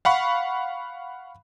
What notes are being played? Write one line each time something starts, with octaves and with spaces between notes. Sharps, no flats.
F5 F#5 B5 C#6